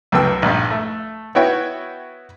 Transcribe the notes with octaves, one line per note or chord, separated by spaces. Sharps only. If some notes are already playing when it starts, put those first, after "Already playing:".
C#2 F#2 B3 A4 G5 E6
A#1 G2
A3
B3 E4 F#4 C#5 G5